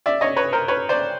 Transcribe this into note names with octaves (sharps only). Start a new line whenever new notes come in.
D5 E5
C#5 D#5
B4 C#5
A#4 C5
B4 C#5
C5 D5